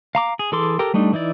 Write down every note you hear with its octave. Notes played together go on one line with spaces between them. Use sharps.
F5 A#5 D6
G#4
E3 G#4 A4 C6 D6
G4 A4 A#4 G5
G3 A3 D4 D#4
E3 D#4 E4 D5